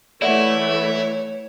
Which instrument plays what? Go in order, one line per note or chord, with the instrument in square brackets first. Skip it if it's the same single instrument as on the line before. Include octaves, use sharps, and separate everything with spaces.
[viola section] E3 A3 [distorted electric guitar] E4 [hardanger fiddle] C#5 [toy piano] D5 E5 F#5